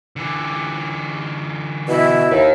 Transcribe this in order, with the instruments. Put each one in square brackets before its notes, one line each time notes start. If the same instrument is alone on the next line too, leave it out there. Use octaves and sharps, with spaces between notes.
[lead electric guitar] D3 E3
[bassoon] B2 [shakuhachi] E4
[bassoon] D#2 [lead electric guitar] D#3